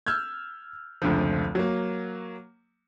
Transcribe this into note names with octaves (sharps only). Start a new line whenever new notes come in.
E6 F6 G6 G#6
F1 C#2 D3 F3
F#3 A#3